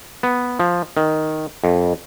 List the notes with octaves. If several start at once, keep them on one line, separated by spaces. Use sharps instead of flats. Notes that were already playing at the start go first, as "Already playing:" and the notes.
B3
F3
D#3
F2